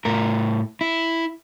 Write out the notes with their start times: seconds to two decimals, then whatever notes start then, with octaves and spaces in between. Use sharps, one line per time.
0.05 A2 A#4
0.81 E4